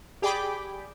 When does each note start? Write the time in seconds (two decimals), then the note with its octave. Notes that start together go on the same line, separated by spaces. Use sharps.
0.22 G4 G#4 D5 G5 B5 D6